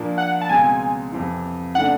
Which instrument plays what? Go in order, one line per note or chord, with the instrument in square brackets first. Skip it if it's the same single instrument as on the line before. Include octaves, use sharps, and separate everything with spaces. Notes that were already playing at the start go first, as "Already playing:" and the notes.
Already playing: [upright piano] A#2 F3 A#3 D4
[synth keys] F#5
A5
[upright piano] C#2 B2 G#3 C4 [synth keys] G#5
[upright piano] F2 C3 E3
[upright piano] C#3 E3 A3 D4 [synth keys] F#5